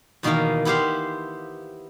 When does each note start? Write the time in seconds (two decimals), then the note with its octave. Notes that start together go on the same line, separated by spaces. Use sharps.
0.23 E2 B2 D#3 A#3 F5
0.65 B3 E4 G4 C5 F5